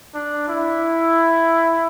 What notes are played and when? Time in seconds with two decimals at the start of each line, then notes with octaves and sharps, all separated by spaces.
0.14 D4
0.48 E4